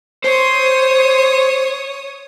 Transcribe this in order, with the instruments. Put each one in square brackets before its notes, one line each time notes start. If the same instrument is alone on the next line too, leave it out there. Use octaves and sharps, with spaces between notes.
[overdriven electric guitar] C5 [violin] C#5 D#6